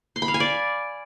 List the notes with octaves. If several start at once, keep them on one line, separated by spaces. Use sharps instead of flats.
C6
B5
F5
G#5
D5